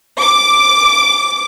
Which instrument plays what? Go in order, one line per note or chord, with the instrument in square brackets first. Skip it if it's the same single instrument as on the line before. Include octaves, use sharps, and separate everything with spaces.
[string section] D6